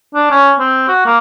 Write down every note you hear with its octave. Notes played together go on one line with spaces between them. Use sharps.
D4
C#4
C4
F#4
A#3